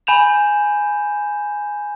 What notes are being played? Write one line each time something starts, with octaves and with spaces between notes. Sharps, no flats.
G#5 B5 G6 E7 F7